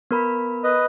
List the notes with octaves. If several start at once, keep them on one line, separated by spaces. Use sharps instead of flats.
B3 A#4 B5
B4 D#5